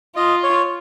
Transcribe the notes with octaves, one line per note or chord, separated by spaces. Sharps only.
F4 D#5
C#5